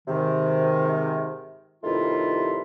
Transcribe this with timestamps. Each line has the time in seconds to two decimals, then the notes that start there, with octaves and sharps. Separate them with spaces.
0.08 G#2 C3 D#3
1.84 G2 C3 D#3 A3 E4 F4